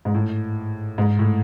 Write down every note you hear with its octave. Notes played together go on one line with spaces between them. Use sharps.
G#2
A2
G#2
A2